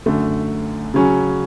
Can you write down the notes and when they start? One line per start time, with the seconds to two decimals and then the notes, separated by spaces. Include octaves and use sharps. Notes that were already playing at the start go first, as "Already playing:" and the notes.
0.06 F#2 D3 A3
0.94 C#3 F#3 C#4